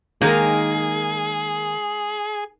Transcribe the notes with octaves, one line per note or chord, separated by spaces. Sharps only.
D#3 G#3 A#3 D#4 G#4 A#4